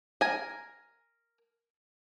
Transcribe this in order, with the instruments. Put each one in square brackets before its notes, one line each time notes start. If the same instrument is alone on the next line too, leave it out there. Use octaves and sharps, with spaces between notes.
[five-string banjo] A#4 G#5